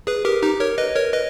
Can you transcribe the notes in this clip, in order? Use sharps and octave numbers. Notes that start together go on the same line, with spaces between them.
G#4 B4
G4 A#4
D#4 G4
A#4 C#5
B4 D#5
A#4 C#5
B4 D#5